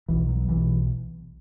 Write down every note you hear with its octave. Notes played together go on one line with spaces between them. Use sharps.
B1 B2 E3
F#3
B1 B2 E3